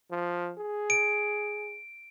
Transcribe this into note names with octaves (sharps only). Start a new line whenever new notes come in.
F3
G#4
D7